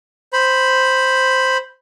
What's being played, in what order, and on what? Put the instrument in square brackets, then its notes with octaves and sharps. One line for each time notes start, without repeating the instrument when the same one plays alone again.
[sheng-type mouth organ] C5 B5